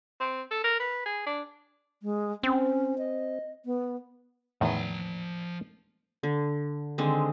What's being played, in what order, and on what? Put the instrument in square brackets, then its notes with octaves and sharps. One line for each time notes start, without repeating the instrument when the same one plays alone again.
[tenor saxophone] C4
A4
A#4
B4
G#4
D4
[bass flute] G#3
[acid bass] C4 [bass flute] C#4
[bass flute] D#5
B3
[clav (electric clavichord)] E2 A2 D#3 [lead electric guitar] F3 A#5
[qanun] D3
D3 D#3 G#3 C4